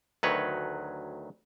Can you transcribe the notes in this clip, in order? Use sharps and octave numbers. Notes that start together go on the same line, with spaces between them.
D2 D#3 F#3 B4 C#5